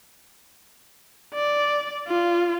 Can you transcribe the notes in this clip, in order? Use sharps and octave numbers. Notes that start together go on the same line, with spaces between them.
D5
F4